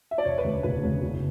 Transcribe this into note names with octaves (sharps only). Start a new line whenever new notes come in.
E5
D5
E1 C#5
B4
D2 C#3
E1 B4
D2 C#3
F#1